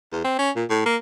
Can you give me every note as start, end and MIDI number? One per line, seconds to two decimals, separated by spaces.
0.12 0.22 40
0.24 0.35 60
0.39 0.51 61
0.56 0.65 46
0.70 0.84 45
0.86 0.96 58